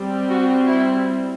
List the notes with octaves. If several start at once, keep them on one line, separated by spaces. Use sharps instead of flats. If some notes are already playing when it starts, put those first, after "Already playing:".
Already playing: G3 C4
F#4
E4